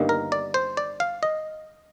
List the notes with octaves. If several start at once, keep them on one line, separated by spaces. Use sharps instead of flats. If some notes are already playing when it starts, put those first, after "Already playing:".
Already playing: G1 G2 D#3 A#3 D#4
A#4
D5
C5
D5
F5
D#5